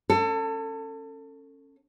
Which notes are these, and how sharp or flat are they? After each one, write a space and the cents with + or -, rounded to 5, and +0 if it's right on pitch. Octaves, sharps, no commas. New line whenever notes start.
C#4 -15 A4 +30